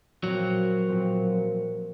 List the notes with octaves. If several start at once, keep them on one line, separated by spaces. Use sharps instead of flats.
A#2 F3 F#3 C4
A#2 F3 C4